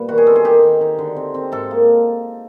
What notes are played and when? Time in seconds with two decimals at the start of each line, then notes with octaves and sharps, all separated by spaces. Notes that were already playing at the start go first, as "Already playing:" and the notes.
Already playing: A#2 G3 B3
0.09 D#3 F#4
0.18 G#4
0.27 C4 A4
0.36 G#4
0.44 D#3 G4
0.62 D#3
0.81 D#4
0.98 D3
1.16 C4
1.34 C4
1.52 G#2 A4
1.71 A#3